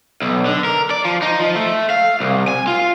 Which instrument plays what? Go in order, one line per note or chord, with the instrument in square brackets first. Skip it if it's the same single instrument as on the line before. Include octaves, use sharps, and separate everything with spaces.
[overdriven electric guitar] B1
D3
A#4
D5
F3
D#4
F3
A3
F5
C2
G#5
F4